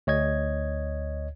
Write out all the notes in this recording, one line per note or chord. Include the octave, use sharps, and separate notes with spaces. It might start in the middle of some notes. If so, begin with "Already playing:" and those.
D2 C#5 D#5 G#6